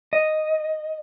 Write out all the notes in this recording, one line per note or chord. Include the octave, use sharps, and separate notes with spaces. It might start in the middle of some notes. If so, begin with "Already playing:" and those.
D#5